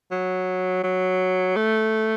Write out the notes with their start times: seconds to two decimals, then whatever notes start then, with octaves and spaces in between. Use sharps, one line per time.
0.11 F#3
0.83 F#3
1.56 A3